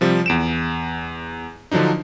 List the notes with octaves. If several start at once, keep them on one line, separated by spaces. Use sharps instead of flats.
C3 F3 G3
E2 D7 E7
D3 F3 F#3 D4 D#4